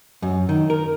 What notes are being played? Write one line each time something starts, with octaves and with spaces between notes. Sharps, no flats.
F#2
D#3
A#4